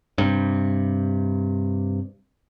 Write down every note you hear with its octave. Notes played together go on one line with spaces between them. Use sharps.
G2 C3